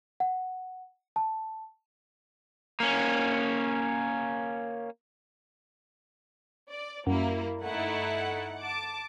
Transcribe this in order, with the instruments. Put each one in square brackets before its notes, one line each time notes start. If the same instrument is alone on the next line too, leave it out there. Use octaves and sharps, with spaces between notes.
[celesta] F#5
A5
[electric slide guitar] A#3 C#4
[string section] D5
[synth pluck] F#2 [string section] G3 A#3 E4
[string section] G1 F#5 [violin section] A3 D#4 E4
[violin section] A5 D6 D7